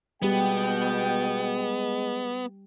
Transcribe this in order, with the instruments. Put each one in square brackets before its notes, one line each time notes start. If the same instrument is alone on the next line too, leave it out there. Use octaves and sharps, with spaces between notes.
[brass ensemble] B2 G5 [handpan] G3 G4 [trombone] G#3 [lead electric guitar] B3